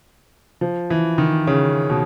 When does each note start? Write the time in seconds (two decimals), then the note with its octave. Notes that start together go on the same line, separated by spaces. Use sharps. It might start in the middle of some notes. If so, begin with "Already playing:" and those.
0.61 F3
0.90 E3
1.18 D#3
1.47 C#3
1.90 B2